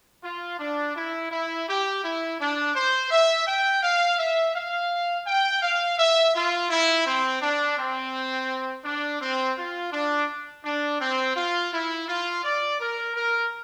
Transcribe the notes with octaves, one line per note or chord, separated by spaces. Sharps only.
F4
D4
E4
E4
G4
E4
D4
C5
E5
G5
F5
E5
F5
G5
F5
E5
F4
E4
C4
D4
C4
D4
C4
F4
D4
D4
C4
F4
E4
F4
D5
A#4
A#4